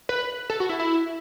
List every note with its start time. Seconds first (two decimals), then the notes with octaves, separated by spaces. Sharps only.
0.09 B4
0.50 A4
0.60 F#4
0.69 E4
0.80 E4